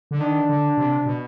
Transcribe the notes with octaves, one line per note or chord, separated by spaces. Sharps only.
D3
D#3 D4
D3
C3
B2